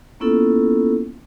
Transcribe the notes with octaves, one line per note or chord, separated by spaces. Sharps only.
A#3 B3 C#4 E4 F4 A4